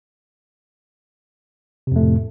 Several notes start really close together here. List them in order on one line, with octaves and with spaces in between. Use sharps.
C3 F2 A3 A2